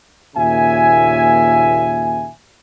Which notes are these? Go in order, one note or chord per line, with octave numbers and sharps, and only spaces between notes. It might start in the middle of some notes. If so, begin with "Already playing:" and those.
D#2 A#2 C#3 E5 G#5